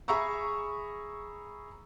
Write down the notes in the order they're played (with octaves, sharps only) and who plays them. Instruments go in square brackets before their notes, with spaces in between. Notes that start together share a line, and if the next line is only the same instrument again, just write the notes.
[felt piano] G#4 E5 A#5 B5 C#6 E6